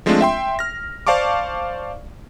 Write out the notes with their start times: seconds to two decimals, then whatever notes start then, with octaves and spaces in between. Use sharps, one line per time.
0.06 F3 G#3 A3 C4 D4 F4
0.21 E5 G5 C6
0.59 F6 A#6
1.07 C5 D5 F5 A5 C#6 D6